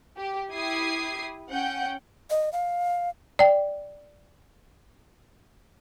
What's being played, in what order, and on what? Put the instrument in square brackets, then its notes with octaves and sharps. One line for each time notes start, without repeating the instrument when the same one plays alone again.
[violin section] G4
E4 G4 D#6 G#6 C7
C#4 F#5 G5 G6
[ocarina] D#5
F5
[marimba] D5 G5